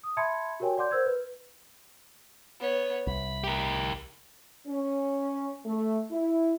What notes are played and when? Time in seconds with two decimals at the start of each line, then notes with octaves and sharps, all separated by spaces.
0.04 D#6
0.17 E5 A5 B5 C6 G#6 C#7
0.60 F#4 G4 A#4 C#5 G5 G#5
0.77 D5 F#5 C6 D6 G6
0.91 A#4 C5 E6 G6 G#6
1.06 B4
2.60 B3 C#5
3.07 C2 B5
3.44 G4 A#4
4.68 C#4
5.66 A3
6.11 E4